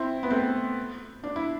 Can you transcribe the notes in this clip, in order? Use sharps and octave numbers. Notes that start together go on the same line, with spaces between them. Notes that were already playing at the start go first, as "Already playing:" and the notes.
Already playing: C4 E4
B3
A3 C4
D4
E4